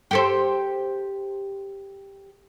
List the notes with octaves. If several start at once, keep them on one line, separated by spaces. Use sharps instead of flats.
G4 A4 C5